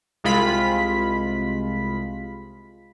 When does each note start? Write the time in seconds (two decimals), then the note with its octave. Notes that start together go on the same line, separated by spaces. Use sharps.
0.24 C2 C3 G#3 F4 B5 B6